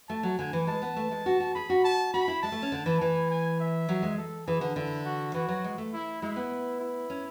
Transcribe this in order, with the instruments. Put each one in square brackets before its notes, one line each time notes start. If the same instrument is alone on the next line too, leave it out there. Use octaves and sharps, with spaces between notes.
[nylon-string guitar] A3 [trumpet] A5
[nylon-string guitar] F#3
[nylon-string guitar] D3 [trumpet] G#5
[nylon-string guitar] E3
[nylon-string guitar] G#3 [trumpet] A5
[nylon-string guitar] B3
A3
G#3
F#4
F#4
[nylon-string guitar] G#4 [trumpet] B5
[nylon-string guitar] F#4
[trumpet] A5
[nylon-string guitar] F#4 [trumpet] B5
[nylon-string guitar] E4
[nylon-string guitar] G#3 [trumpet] A5
[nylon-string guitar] A3
C#4
D3
E3
[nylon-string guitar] E3 [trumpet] G#5
[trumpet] G#5
E5
[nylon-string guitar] F#3
G#3
[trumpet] A4
[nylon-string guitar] E3 [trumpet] G#4
[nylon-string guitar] D3
[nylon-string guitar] D3 [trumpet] E4
[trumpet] F#4
[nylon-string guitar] E3 [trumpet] F#4
[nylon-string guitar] F#3
G#3
A3
[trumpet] E4
[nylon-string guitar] G#3 [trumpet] E4
[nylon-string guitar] B3
[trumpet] E4
[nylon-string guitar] C#4